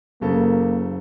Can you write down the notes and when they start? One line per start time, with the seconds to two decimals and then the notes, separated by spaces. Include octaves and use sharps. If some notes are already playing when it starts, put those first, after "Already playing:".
0.21 F#1 C#3 A#3 A4